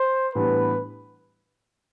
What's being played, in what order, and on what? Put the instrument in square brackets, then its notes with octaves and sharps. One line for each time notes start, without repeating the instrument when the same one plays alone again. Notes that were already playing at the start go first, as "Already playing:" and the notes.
Already playing: [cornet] C5
[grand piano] A2 E3 G3 B3 D4 [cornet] B4